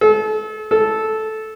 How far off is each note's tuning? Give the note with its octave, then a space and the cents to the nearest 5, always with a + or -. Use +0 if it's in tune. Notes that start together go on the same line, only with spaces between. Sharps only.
A4 -35
A4 -10